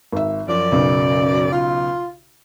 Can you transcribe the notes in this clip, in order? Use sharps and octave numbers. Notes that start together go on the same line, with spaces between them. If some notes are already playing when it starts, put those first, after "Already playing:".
G#1 E5
F#2 F3 D5
B1 C#3
F4